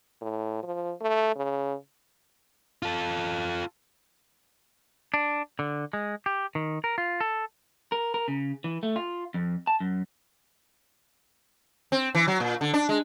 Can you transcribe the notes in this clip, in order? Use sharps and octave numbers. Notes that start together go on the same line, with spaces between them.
A2
F3
A3
C#3
F4 A4
D4
D3
G#3
G4
D#3
A#4
F4
A4
A#4
A#4
C#3
E3
A3
F4
F2
A5
F#2
C4
E3
F#3
A#2
D3
D4
G#3